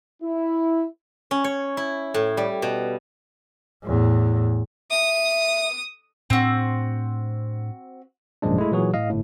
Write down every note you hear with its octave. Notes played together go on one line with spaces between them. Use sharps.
E4
C#4
C#5
E4
A2
G3
B2
E2 A2
E5 D#6
A2 C4 D4 F#4
G#1 F#2 A#2 F3 G#3 D4
G#3 A3 E4
A#2 E3 F#3 F#4 G#4
A2 D#5 F5
G1 A2